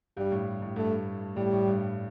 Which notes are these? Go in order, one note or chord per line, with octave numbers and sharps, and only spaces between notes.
G2 G3
A2
A2
G2 A3
A2 G3
A2
G2